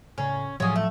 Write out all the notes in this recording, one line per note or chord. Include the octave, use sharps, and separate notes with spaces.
A2 C#3 C#4
A2 F3 F#3 C#4 G#4
A3